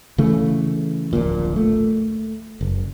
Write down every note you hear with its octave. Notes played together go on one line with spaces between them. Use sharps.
C#3 E3 A3
D1 A#1 A#2
A3
F#1